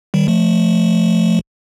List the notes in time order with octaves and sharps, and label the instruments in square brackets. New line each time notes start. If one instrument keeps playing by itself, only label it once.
[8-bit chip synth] D#3 G3
F3 A3